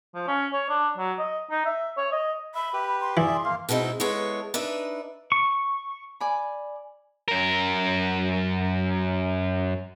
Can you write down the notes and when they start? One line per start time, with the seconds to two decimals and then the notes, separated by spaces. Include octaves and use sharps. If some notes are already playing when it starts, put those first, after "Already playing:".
0.14 F3
0.27 C#4
0.52 C#5
0.69 D4
0.97 F#3
1.19 D#5
1.50 D#4
1.66 E5
1.97 C#5
2.12 D#5
2.55 E5 B5
2.73 G4 B4
3.01 C6
3.17 E3 G#4 D5 E5
3.45 A#3 F5
3.69 B2 G#3 C4 D#4 E4
4.00 G#3 B3 E4 A4 C#5
4.54 D4 D#4 B4 E5
5.32 C#6
6.20 D5 G#5 B5
7.28 F#2 A#4